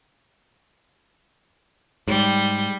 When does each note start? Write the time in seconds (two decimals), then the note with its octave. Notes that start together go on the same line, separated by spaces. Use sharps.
2.08 G#2 G3